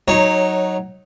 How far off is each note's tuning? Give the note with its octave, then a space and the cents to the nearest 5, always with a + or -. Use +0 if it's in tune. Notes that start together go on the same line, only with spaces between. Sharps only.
F#3 +0 D#4 +0 C#5 -15